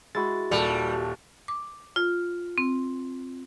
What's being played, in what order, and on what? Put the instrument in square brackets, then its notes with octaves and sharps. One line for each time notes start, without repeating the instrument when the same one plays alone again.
[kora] G#3 E4 [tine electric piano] F#4 A6
[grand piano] D#1 A4 F7 [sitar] G3
[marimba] D6
F4
C4